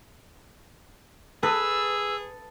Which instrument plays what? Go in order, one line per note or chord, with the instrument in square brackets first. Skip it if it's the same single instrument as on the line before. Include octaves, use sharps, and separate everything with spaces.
[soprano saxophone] G#4 [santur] A4 D#6 [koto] B4 [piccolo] E6